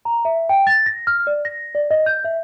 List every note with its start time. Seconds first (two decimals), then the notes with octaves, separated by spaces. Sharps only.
0.05 A#5
0.25 E5
0.49 G5
0.67 A6
0.86 A#6
1.07 F6
1.27 D5
1.45 A#6
1.75 D5
1.91 D#5
2.06 G6
2.24 E5